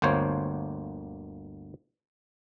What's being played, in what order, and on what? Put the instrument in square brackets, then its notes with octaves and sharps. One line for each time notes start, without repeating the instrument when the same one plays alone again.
[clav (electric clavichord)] G1 D2 A#3 C5 C#5